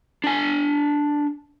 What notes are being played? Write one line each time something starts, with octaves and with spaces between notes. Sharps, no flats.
D4 G#5